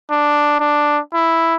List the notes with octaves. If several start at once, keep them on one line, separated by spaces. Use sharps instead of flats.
D4
D4
E4